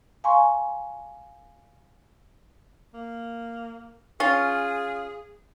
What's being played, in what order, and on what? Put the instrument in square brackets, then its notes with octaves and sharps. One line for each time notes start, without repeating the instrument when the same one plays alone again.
[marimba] F5 G#5 A#5 C6 C#6
[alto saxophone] A#3
[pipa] C#4 F4 [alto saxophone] G#4